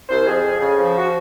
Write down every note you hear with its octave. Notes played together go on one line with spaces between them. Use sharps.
C2 C5
F2 G#4
F2
C#3
F3
F#4